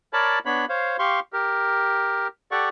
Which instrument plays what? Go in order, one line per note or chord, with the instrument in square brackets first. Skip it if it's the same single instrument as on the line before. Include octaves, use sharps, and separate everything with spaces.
[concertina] A#4 C#5 D5 A5 B5
B3 D4 C#5 B5
C5 C#5 F5
G4 F5 C6 C#6
G4 A#4
G4 A4 D5 F#5 C#6